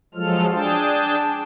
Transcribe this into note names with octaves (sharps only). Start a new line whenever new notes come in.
F3 F#3 G#3 F4 A4 F6
D4 G#4 G5 A5